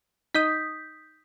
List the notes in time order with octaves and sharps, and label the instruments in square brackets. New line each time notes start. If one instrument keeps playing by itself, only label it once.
[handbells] D#4 D#5 [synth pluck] D#6 G6 B6